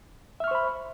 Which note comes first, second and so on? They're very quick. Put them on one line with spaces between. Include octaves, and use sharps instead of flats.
E5 F6 C#6 C5 B5